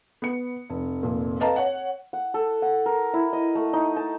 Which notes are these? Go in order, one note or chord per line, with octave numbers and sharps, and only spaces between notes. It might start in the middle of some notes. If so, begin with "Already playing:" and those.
B3 C#7
F1
F1 A#2
A4 B4 D#5 F5 A5 A#5
C#5 F#5
F#5
A4
F#5
A#4
E4
D#5
A3
D#4
A5